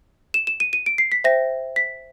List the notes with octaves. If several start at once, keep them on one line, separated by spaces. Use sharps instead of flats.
E7
E7
D#7
D#7
D7
C7
B6
C5 E5 G5 A#6
B6